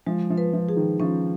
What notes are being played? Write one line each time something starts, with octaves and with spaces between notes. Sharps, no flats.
F3 G#3
F3
B4
F3
G#4
D#3
F3 C#4